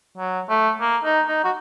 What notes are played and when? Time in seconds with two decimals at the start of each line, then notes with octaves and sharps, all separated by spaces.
0.18 F#3
0.49 A3
0.81 A#3
1.05 D#4
1.28 D#4
1.44 F#4